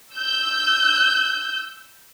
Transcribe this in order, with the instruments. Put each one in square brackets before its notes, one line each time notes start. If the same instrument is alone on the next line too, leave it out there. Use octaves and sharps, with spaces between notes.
[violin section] E6 G6